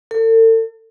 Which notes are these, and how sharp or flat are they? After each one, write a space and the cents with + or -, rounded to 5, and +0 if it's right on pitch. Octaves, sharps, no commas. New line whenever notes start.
A4 +40